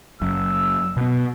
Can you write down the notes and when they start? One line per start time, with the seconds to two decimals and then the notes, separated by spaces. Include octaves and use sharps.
0.21 F#1 F#2 E6
0.97 B2 B3